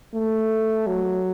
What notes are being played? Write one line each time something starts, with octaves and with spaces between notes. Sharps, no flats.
A3
F#3